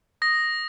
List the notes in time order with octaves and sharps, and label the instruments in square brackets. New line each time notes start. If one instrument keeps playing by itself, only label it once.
[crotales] D#6 A#6